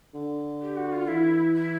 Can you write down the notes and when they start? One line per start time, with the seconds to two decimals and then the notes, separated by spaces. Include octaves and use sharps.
0.14 D3
0.61 G4
0.76 F#4
0.92 F4
1.07 E3 E4
1.54 E4